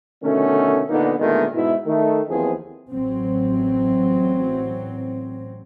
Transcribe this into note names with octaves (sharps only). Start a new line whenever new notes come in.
B2 D3 D#3 A3 C#4
A#2 D3 A#3 B3 D#4
A#2 D3 D#3 G#3 A3 B3
G#2 B2 E4
D#3 A3
D#2 E3 F3 B3 C4 G#4
A1 F#3 C4